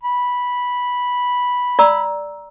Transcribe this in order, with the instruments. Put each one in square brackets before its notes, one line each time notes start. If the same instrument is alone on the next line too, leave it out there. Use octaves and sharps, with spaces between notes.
[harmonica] B5
[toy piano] D5 A#5 E6